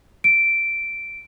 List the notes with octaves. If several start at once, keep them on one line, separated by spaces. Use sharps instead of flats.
D7